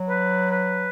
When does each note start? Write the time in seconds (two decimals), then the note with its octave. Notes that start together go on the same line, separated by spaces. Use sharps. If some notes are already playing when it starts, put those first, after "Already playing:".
Already playing: F#3
0.09 B4
0.51 B4